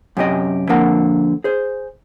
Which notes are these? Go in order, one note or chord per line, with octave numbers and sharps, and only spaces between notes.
F#2 C3 G4 D#5
D3 F3 A#3 C4 A#4 F#5
G#4 C5